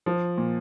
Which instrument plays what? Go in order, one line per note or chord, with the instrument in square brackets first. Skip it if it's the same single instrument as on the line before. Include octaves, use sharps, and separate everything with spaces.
[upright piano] F3
A#2